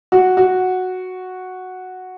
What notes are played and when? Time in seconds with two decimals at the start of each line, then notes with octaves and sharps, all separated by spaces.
0.12 F#4
0.37 F#4